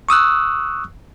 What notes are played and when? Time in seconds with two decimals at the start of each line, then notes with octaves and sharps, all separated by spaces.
0.09 C#6 D#6 E6 F#6